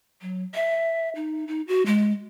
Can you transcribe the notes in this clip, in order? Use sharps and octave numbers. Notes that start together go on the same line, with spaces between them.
F#3
E5
D#4
D#4
F#4
G#3